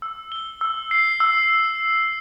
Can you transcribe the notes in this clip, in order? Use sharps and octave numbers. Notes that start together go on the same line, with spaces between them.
E6
G7
E6
C7
E6